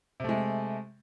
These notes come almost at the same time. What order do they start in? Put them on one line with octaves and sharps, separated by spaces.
C3 A3 G#3